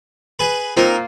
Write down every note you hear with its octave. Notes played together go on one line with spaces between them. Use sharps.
G#4 B4
A#2 A#3 C4 D#4 F4 A#4